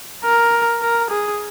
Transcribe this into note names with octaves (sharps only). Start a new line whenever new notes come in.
A#4
A#4
G#4